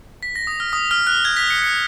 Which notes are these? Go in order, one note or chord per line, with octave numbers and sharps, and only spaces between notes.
B6
A#6
D#6
F6
D#6
F6
F#6
G#6
B6
C#7
C#7